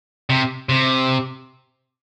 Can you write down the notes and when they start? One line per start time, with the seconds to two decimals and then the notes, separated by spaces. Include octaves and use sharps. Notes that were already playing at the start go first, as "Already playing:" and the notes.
0.30 C3
0.69 C3